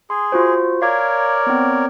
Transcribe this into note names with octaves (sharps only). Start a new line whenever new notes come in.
G#4 C6
F4 F#4 C5
A#4 C#5 D5 F5 G#6
B3 C4